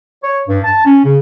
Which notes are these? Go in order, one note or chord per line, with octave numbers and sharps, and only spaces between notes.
C#5
G2
A5
C#4
C#3